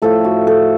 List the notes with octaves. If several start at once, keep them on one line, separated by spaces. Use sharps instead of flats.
A2 F3 A3 A4
F#4
A4